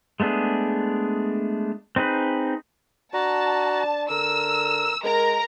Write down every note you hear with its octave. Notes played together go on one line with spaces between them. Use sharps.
G#3 A3 B3 D4 G#4
C4 D#4 G#4 B4
D4 F#4 A5 A#5
D3 A#4 E6
G#3 A#4 A#5